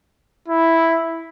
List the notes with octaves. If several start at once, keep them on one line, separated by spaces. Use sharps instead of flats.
E4